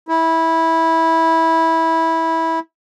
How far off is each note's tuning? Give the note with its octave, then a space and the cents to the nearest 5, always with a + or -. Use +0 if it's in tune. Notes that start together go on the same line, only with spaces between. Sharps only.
E4 -15